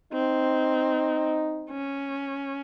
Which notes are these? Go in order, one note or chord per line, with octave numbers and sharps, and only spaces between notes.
C4 D#4
C#4